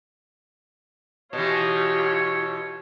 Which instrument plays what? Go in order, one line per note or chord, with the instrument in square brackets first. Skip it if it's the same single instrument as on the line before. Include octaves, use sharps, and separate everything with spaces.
[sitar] B2 E3 [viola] F4 G4 [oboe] C#5